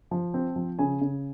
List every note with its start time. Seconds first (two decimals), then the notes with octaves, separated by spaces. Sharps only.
0.11 F3
0.34 C4
0.56 F3
0.79 C#3 G#5
1.01 C#3